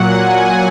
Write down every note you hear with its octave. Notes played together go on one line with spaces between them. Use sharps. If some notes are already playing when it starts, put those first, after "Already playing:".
Already playing: A#2 F#3 F#5
G#5